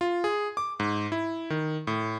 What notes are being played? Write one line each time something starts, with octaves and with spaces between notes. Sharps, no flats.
F4
G#4
D6
G#2
E4
D#3
A2